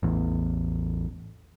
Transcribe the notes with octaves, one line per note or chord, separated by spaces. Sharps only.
A1 E2